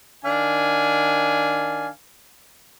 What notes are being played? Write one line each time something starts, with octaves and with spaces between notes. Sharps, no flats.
D#3 D4 F5 G#5